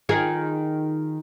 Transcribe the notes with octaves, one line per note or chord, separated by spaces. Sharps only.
D#3 F4 G#4